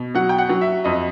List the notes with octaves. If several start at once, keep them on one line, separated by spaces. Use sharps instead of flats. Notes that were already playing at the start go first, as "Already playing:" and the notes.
Already playing: B2
F#3 F#5
G5
F#5
F#3
E5
F2 D#5